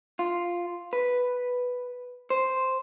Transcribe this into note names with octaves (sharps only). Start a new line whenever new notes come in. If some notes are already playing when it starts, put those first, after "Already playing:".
F4
B4
C5